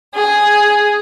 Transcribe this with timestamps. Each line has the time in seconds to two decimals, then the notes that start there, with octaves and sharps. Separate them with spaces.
0.14 G#4